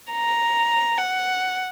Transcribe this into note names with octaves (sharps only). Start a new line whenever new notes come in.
A#5
F#5